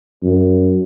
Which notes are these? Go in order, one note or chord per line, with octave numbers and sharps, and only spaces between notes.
F#2